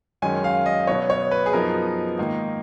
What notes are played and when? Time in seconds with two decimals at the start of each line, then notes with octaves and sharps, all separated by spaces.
0.22 F#2 D#3 G#3 C#4 G#5
0.44 F5
0.66 D#5
0.87 B2 F#3 B3 C#5
1.10 C#5
1.31 B4
1.46 G#4
1.53 F#2 F3 B3 D#4 A#4
2.18 G#2 D#3 A#3 D#4